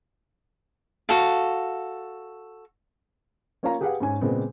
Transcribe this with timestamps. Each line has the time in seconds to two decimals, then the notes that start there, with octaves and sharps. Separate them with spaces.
1.09 F#4 A4 F5
3.63 A#3 C#4 F4 C#5 F5 A#5
3.81 G4 G#4 B4 F5 F#5
4.00 G#2 C#4 G#5
4.21 A#2 C#3 G#3 B3 C4